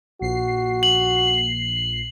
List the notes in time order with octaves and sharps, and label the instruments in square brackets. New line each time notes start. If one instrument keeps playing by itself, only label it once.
[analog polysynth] A#1 C7 [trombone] F#4
[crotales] F#7